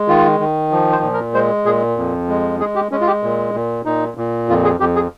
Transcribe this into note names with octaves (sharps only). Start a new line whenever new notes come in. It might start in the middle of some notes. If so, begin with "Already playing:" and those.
Already playing: G#3
D#3 F4
D#3
F3
C5
A#2
A#4
G#3 C5
A#2 G#4
F2
G#3
G#3 G#4
G4
G#3 C#4
F4
G4
A#2
A#2
A#2 D#4
A#2
F2 F4
G#4
F2 G4
G#4